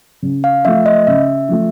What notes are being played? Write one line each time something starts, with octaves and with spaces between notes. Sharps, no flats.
C#3
F5
F3 A3 E5
D#5
C#3 E5
F3 A3